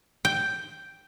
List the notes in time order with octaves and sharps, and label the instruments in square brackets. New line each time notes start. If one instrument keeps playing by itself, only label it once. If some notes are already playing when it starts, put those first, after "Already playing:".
[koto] G5